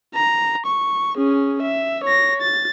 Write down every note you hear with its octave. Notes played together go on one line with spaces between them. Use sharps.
A#5
C#6
C#4 G#4
E5
C#5 A#6
A6